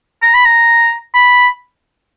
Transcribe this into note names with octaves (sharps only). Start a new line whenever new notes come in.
A#5
B5
A#5
B5